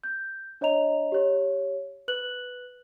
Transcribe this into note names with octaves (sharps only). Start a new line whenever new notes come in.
G6
D4 C#5 D#5 A#5 F7
G4 C#5
B4 F#6 F#7